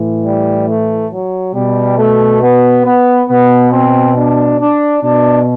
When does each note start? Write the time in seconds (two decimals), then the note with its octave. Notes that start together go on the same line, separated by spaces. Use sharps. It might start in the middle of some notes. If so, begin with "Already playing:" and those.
Already playing: A2 E3
0.24 G3
0.67 A3
1.11 F#3
1.54 B2 G3
1.98 A3
2.42 B3
2.85 B3
3.29 B2 B3
3.72 C4
4.16 D4
4.60 D4
5.03 B2 D4